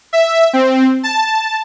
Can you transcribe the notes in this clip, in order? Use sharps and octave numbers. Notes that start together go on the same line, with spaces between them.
E5
C4
A5